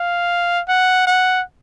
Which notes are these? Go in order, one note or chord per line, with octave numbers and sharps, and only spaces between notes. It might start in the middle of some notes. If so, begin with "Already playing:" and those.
Already playing: F5
F#5
F#5